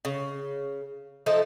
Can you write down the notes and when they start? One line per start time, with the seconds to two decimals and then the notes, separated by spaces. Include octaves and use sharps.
0.05 C#3
1.26 F3 A3 D#4 A4